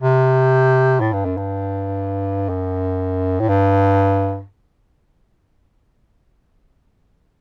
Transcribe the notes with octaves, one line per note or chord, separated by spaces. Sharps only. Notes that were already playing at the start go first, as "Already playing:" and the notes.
C3
A2
G2
F#2
G2
F#2
A2
G2